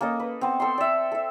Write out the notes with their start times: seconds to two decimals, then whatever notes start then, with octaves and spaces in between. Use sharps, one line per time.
0.01 A#3 C#4 A4 D#5
0.20 B4
0.41 B3 C4
0.60 A4 G5 C6
0.78 D5 E5
1.12 A4 E5